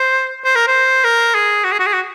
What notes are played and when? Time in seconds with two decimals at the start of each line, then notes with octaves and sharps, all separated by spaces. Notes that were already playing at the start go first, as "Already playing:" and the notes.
Already playing: C5
0.45 C5
0.56 A#4
0.67 C5
1.04 A#4
1.35 G#4
1.64 F#4
1.72 G#4
1.79 F#4
1.86 G#4
1.93 F#4